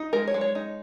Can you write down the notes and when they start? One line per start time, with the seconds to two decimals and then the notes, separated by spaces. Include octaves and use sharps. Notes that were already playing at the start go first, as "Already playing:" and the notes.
Already playing: D#4
0.13 G#3 A#4
0.27 C#5
0.34 G#3
0.41 C#5
0.55 D#4